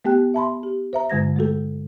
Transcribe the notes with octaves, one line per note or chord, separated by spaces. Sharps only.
A3 B3 G4 G5 F#6
E5 A5 B5 C6
G4
C5 E5 A#5
G2 D3 G#3 G#6 A#6
G#3 A3 F#4 A4